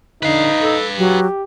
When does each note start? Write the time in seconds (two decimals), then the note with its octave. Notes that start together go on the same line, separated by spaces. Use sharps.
0.23 D3 D#4 B4 F5
0.62 A4
0.98 F#3 G4